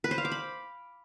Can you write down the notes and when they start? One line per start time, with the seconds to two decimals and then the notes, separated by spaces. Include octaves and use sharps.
0.04 B4
0.11 C5
0.18 F5
0.25 D6
0.32 B5